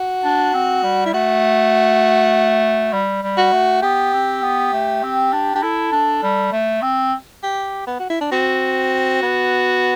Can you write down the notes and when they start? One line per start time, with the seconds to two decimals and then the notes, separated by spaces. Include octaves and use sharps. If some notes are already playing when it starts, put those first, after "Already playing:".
Already playing: F#4
0.24 D4
0.54 C4
0.84 G3
1.06 E4
1.13 A3 F#4
2.93 G3
3.23 G3
3.38 F#4
3.52 A3
3.82 B3 G4
4.13 C4
4.42 B3
4.73 A3
5.03 C4
5.33 D4
5.54 D4 G4
5.63 E4 A4
5.92 D4
6.23 G3
6.52 A3
6.82 C4
7.43 G4
7.87 B3
7.99 F#4
8.10 E4
8.21 D4
8.32 C4 F#4
9.23 B3